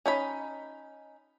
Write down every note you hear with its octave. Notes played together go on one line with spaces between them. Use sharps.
C#4 D#4 B5